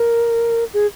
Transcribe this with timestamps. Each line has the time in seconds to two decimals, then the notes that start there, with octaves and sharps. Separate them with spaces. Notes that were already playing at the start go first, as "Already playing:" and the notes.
Already playing: A#4
0.74 G#4